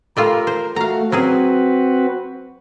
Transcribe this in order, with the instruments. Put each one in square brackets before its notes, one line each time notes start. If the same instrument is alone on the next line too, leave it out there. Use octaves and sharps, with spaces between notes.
[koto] G3 A3 F4 [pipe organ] A#4
[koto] C5
[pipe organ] A3 F#4 [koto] F5 A#5
[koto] F#3 C#4 G#4 [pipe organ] C4 F#4 B4